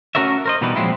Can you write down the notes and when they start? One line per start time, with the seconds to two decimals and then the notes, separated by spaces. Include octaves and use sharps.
0.15 A3 C#4 F#4 A#4 C#5 E5
0.46 A#4 C5 D#5
0.61 B2 E3 G3 D#4 E4 B4
0.76 A#2 F3 F#3 G#3 C4 E4